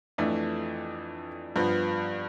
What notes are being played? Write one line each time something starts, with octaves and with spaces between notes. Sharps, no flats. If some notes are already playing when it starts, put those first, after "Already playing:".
F2 E3 A3 D4
G2 F3 B3